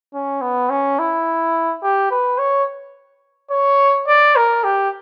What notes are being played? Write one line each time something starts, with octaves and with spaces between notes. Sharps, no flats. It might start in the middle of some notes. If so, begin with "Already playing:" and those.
C#4
B3
C#4
E4
G4
B4
C#5
C#5
D5
A#4
G4